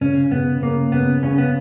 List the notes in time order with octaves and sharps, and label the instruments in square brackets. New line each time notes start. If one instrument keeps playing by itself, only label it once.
[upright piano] C#3 [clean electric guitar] C#4
[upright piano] C#3 [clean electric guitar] B3
[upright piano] C#3 [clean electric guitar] A#3
[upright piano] C#3 [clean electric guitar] B3
[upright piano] C#3 [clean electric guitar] C#4
[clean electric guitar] B3